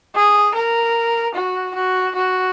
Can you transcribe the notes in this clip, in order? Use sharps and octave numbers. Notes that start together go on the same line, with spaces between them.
G#4
A#4
F#4
F#4
F#4